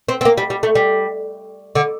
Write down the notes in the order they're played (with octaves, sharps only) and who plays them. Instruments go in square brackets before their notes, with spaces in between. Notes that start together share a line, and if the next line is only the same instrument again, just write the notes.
[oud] C4
C4
A#3
G3
G3
A3
G3
D3